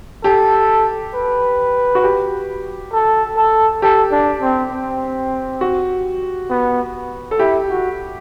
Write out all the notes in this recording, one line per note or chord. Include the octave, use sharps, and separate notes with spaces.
G4 A4
B4
F#4
G4
A4
A4
G4 A4
D4
C4
C4
F#4
B3
A4
E4 G4
F#4